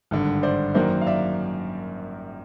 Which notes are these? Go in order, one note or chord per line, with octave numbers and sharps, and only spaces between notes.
G#1 G2 D3
C5 D5
F#2 D#3 F#3 A#3 C5 D5
F5
D5 E5